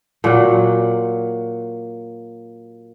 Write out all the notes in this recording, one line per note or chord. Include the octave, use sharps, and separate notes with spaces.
A#2 F#3 F#5